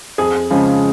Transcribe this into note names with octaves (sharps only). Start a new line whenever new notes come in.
F2 G#4
C#3 F3 G#3